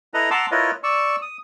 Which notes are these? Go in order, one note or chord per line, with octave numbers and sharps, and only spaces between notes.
E4 A4 B4 D#5 A#5
F#5 A5 A#5 C6 D6 E6
E4 F4 A#4 B4 C#5 D#5
D5 C#6 E6
D#6